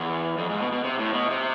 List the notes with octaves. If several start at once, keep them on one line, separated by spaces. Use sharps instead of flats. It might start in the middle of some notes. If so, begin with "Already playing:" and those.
Already playing: E2
F2
G#2
B2
B2
C3
A2
B2
C3